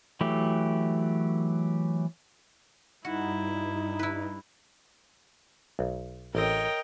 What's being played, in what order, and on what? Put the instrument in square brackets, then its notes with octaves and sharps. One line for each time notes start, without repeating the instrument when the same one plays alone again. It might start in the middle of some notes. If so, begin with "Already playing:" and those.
[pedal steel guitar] E3 F#3 A3 G4
[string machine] G2 [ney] D#4 [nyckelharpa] E4 [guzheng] F#4
[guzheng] E4 B4
[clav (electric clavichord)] B1
[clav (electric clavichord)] A1 C4 [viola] A#4 G5 [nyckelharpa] C#5 D#5